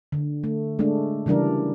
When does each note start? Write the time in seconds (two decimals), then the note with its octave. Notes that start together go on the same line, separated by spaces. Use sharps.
0.12 D3
0.44 A3
0.79 G#3 A3 D4
1.26 C#3 E3 G3 D4 A#4